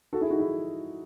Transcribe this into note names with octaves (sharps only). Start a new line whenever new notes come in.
F#4 A4
E4 G#4
D#4 F#4
E4 G#4